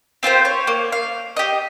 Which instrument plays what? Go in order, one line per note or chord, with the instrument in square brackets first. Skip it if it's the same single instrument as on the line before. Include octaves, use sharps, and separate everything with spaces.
[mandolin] C4 F4 G4 C5
C#5
A#3
F5
G4 D#5